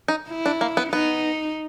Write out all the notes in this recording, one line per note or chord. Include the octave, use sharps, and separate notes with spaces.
D#4
E4
D4
A#3
B3
B3 D#4